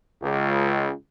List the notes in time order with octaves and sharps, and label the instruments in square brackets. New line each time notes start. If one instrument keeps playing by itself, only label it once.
[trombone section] C#2